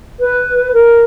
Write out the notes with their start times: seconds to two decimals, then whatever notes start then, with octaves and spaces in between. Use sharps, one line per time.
0.20 B4
0.73 A#4